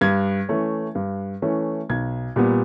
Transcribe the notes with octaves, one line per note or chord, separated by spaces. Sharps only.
G2 G#6
E3 A3 C#4
G2
E3 A3 C#4
B1 G#6
A#2 G3 B3